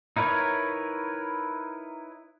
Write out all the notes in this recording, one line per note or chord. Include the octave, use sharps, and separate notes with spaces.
D#4 E4 A#4 B4 C#5